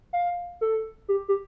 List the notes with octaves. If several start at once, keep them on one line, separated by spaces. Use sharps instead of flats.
F5
A4
G4
G4